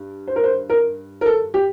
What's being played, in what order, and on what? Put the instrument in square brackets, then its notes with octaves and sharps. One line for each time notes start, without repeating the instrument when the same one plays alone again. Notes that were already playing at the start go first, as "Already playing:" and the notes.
Already playing: [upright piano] G2
C5
A#4
C5
A#4
A#4
A4
G4